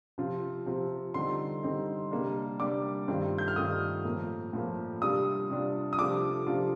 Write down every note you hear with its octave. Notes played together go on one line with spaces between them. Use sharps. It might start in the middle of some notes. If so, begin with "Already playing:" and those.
C3 F3 C4 F4
C3 F3 C4 F4
D3 G3 C4 D#4 C6
D3 G3 C4 D#4
C3 G3 A#3 D4
C3 G3 A#3 D4 D6
G2 D#3 A3 C4 F4
G6
F6
G2 D#3 A3 C4 F4 D#6
A2 F3 A#3
A2 F3 A#3
C3 G3 D4 F4 D#6
C3 G3 D4 F4
D#6
C3 F3 A3 D4 F4 D6
C3 F3 A3 D4 F4